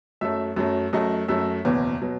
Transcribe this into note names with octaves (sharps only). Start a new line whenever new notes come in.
F#2 F#3 A3 E5
F#2 F#3 A3
F#2 F#3 A3 D#5
F#2 F#3 A3 E5
F#1 E2 B2 F#3
B2 F#3